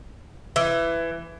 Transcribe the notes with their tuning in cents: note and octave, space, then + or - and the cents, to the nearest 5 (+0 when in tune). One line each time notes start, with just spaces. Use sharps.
E3 +15